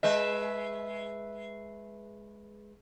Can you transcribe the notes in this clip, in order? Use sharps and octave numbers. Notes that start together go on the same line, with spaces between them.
G#3 B4 D#5 E5